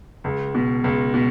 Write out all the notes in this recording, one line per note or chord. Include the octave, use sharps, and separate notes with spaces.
C#2
B2
C#2
B2